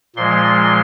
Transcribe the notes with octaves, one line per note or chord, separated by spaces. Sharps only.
A#2 F3 G#3 C6